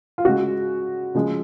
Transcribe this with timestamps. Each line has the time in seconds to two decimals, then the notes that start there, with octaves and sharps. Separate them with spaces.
0.18 F4
0.25 C#3 G#3 F#4
1.15 C#3 F3 G#3